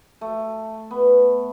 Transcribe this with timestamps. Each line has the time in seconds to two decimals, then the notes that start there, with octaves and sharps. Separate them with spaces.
0.21 A3
0.91 B3